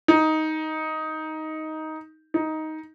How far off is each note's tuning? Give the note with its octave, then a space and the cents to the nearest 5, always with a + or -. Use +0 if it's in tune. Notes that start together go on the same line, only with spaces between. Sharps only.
D#4 +10
D#4 +10